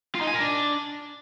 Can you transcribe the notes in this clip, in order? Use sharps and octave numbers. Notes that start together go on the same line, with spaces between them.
F4
D#4
G#5
A#4
D4